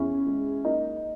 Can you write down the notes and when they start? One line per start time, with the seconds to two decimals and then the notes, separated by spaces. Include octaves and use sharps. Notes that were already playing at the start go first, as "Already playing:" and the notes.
Already playing: E2 C#4 E4
0.26 G#3
0.64 A#3 D#4